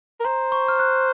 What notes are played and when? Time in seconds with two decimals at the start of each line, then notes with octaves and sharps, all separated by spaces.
0.20 A#4
0.25 C5 A#5
0.52 C#6
0.68 F6
0.79 F#6